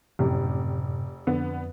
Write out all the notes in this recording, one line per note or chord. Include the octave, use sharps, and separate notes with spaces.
F1 F#2 A2 C3 G4
F2 D3 B3